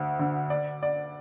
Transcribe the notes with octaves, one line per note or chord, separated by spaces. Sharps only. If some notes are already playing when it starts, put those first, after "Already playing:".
Already playing: D2
D3
D5
D5